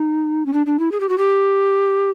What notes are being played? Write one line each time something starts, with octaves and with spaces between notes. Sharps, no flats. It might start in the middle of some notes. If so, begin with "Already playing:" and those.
Already playing: D#4
C#4
D4
D4
E4
G#4
G4
F#4
G4